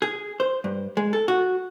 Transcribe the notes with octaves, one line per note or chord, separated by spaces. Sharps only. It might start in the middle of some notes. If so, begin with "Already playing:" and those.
G#4
C5
G2
G#3
A4
F#4